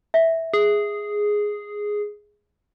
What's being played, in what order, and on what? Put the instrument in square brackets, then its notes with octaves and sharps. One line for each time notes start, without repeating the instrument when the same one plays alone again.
[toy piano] E5
[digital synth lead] G#4